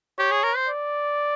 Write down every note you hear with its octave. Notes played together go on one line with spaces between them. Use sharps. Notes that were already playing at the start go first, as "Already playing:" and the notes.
G4 C#5
G#4
A#4
C5
D5